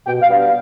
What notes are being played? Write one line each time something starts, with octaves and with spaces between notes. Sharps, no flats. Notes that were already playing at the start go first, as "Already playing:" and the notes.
B2 G5
F5
G3 B3 D4
F5